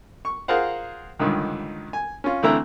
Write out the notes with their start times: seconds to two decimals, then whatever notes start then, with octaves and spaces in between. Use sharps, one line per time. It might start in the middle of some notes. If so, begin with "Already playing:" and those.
0.25 C#6
0.48 F4 G#4 A#4 C5 F5 F#5
1.19 C#2 G2 D3 D#3
1.93 G#5
2.24 C#4 F4
2.43 D3 E3 A3 C4 E4 A#5